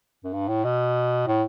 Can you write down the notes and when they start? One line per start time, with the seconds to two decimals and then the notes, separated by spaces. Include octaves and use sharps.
0.24 F#2
0.33 G2
0.48 A2
0.65 B2
1.27 A2